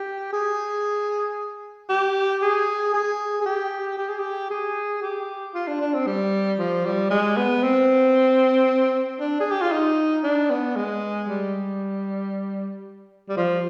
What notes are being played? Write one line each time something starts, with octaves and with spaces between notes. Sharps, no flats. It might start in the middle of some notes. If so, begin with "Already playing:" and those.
Already playing: G4
G#4
G4
G#4
G#4
G#4
G4
G4
G#4
G4
G#4
G4
F4
D4
D4
C4
G3
F3
G3
G#3
B3
C4
D4
G#4
G4
F4
D#4
D4
B3
G#3
G3
G3
F3